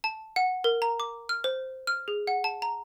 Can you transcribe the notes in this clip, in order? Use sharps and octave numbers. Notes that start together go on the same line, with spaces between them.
A5
F#5
A#4
A#5
D6
F6
C5
F6
G#4
F#5
A5
A#5